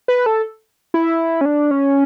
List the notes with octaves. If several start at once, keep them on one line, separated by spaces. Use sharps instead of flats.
B4
A4
E4
C#4
D4
C#4